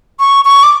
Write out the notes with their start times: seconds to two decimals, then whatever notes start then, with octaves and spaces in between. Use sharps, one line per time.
0.20 C#6
0.45 C#6
0.63 D6